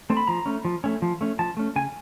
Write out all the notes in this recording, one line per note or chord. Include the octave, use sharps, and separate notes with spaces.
A3 C4
B5
F3 A#5
A3 C#4
F3
A3 C#4
F3
A3 C#4
F3 A5
A3 C#4
C#3 G#5